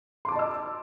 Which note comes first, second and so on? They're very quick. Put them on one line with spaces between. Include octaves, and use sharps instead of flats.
C6 D6 A5 D#5 E6